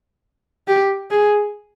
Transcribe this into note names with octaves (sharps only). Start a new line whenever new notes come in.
G4
G#4